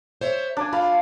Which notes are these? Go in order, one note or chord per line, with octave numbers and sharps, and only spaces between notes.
C5 C#5 E5
A#2 D4 D5 G#5
F4 F5 B5